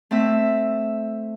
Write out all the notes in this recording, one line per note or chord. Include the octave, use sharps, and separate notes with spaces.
A3 C4 E5